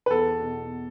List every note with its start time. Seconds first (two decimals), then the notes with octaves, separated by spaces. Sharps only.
0.06 B4
0.10 E2 A4
0.42 B2